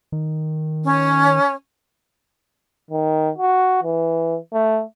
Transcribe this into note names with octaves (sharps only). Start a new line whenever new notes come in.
D#3
C#4
D#3
F#4
E3
A3